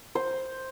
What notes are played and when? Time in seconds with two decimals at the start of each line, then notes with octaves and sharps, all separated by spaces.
0.15 C5